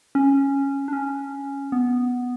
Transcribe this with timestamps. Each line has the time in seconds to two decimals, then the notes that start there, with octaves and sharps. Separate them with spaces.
0.15 C#4
0.88 D4
0.93 C#4
1.72 B3